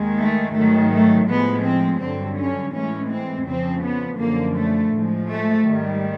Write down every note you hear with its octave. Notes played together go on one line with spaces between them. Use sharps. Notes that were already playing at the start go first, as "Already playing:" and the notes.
Already playing: D#2 D#3 G#3
A3
G#2 D#3 F#3 A3
A3
A2 F3 G#3 B3
C4
G2 D3 F#3 C4
C#4
A2 E3 G#3 C#4
C4
F2 C#3 F3 C4
B3
F#2 D3 F3 A#3
A3
A2 F3 G#3
A3
G#2 D#3 G3